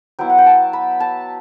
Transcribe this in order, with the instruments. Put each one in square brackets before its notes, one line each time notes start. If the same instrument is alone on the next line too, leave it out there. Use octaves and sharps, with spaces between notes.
[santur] F#3 B3 E4 G5
F#5
G5
A5
B5
A5